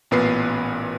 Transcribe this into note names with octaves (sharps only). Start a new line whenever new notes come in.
A1 A#2 B3 B4 C7